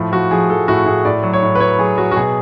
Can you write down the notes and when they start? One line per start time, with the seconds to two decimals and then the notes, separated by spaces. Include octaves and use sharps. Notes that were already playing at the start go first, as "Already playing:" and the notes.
Already playing: A2 F3
0.12 F3 F#4
0.31 F3 G#4
0.50 F3 A4
0.68 A2 F#4
0.86 A2 G#4
1.05 A2 D5
1.23 F#3
1.33 C#5
1.43 A2
1.55 B4
1.60 F#3 C#5
1.79 F#3 G#4
1.98 F#3 F#4
2.11 F#4
2.16 B2 G#4